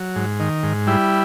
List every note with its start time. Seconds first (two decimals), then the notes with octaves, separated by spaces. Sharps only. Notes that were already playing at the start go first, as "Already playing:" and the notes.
Already playing: F#3
0.16 G#2
0.40 D#3
0.63 G#2
0.87 G3 E4